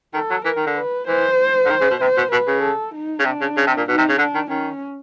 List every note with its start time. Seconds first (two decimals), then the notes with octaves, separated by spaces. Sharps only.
0.14 D#3 A4
0.31 F#3
0.45 E3 A#4
0.56 D#3
0.66 D3
0.77 B4
1.08 E3 C5
1.65 D3
1.70 D#3
1.81 C#3
1.91 B2
2.01 C3 C5
2.17 B2
2.32 B2 B4
2.47 C#3
2.63 A4
2.95 D#4
3.19 C#3
3.25 C3 D4
3.41 C#3
3.57 C#3
3.67 C3
3.77 A#2
3.88 B2 D#4
3.98 C3
4.09 C#3
4.18 D3 D4
4.34 D#3
4.50 D#3 C#4